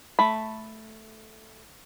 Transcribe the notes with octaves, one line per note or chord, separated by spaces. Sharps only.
A3 B5